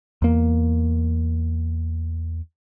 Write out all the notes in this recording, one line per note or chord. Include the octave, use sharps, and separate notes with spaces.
E2 A#3